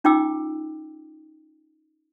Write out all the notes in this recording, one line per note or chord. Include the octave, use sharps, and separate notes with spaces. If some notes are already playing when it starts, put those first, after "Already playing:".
C#4 D#4 F4 G5 D6 E6